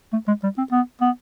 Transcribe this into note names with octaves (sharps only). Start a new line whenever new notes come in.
A3
G#3
G3
C4
B3
B3